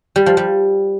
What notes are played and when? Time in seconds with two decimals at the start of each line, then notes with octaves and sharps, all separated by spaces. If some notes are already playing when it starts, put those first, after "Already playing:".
0.16 G3
0.26 F3
0.37 G3